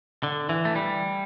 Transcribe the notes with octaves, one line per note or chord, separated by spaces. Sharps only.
D3
E3
A3
G3